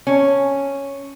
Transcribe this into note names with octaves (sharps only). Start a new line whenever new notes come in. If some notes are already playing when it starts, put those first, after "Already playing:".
C#4